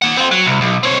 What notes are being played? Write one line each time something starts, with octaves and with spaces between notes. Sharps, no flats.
A#3 F#5
C4 F4
F#3
C2
B1
C4 C#5